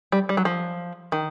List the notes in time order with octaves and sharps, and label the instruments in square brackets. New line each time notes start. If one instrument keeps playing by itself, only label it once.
[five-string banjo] G3
G3
F#3
F3
D#3